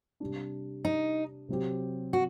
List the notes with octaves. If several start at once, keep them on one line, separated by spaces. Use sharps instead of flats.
C3 G3 D4
D#4
C3 F#3 C4 G4
F#4